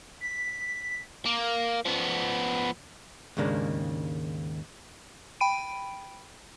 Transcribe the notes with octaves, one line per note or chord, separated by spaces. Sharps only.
B6
A#3
F3 B3
D#2 G#2 C#3 G#3 A#3 D4
G5 B5 D7 D#7